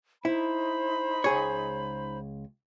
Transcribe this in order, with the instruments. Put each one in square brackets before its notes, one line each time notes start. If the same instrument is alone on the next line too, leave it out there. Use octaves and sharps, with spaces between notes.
[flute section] D#4 C5 B5 [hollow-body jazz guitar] E4
[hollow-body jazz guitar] C#2 G#4 C#5